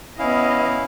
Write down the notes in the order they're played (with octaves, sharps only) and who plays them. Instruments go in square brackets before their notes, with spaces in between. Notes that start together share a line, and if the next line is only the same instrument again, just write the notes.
[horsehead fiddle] B3 D#5 [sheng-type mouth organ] C#4 E4 F5